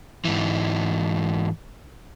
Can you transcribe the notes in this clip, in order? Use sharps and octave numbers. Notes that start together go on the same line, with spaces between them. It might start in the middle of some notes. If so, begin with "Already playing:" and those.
G#2 E3